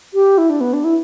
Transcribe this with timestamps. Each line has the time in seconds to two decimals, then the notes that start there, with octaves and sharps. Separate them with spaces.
0.14 G4
0.38 E4
0.50 D4
0.61 B3
0.73 D4
0.84 E4